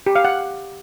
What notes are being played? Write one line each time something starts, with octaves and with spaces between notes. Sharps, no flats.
G4
F5
F#5